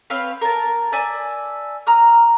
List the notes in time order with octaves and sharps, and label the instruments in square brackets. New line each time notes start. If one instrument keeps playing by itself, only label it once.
[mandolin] C4 B4 C#5 F5
A#4 A5
D5 E5 G#5 A5
A#5 D#6 F6